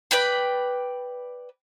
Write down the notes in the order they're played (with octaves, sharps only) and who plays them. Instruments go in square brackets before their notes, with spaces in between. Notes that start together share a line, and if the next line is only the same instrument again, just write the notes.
[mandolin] B4 D5 G5 B5